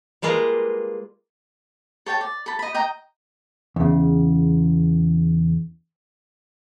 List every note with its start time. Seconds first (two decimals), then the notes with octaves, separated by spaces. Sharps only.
0.22 G3 G#3 A#3 F4 B4 A#5
2.06 A4 C#5 G5 A5
2.21 D5
2.46 A4 B5
2.59 D#5 B5
2.74 D#5 G5 A#5
3.76 E2 C#3